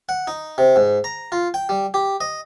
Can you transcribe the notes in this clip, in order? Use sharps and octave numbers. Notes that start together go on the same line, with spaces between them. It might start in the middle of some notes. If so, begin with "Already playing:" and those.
F#5
D#4
C3
G#2
A#5
F4
G5
G3
G4
D#5